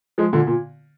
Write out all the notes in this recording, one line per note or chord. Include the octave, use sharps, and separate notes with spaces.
F3 G#3
A#2 D3
A#2